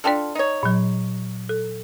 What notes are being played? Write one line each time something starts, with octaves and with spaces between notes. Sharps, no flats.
D4 F4 A4 D5 G5 A5
D#4 C#5
A#2 F#3
A4